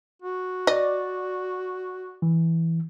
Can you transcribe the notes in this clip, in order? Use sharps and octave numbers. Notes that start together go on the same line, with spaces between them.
F#4
D5 D#5
E3